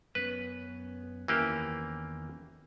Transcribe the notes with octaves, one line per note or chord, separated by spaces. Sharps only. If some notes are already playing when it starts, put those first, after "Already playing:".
F#2 B3 C#4 B4
E2 D#3 E3 A#3 C#4 G4